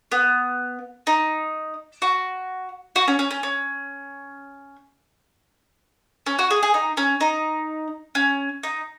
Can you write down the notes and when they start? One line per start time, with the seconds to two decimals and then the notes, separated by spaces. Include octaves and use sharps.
0.12 B3
1.07 D#4
2.02 F#4
2.96 F#4
3.08 C#4
3.19 C#4
3.31 C#4
3.43 C#4
6.26 C#4
6.39 F#4
6.51 G#4
6.63 G#4
6.74 D#4
6.97 C#4
7.21 D#4
8.15 C#4
8.63 D#4